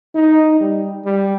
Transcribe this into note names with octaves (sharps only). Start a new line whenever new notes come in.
D#4
G3
G3